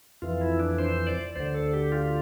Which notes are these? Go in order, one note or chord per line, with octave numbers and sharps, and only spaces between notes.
F2 E3 F4
E4
D4
C5
D5
D2 D3 C5
A4
G4
F4